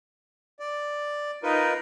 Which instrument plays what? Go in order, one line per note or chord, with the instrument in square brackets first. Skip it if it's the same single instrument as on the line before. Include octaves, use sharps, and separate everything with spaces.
[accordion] D5
[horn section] D#4 [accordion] F4 A#4 B4